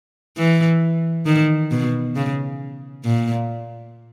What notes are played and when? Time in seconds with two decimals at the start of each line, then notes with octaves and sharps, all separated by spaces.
0.37 E3
1.26 D#3
1.71 B2
2.16 C#3
3.05 A#2